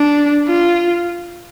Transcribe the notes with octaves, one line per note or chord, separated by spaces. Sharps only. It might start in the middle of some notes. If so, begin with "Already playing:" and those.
Already playing: D4
F4